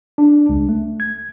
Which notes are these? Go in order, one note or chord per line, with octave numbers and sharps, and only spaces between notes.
D4
C#2
A3
G#6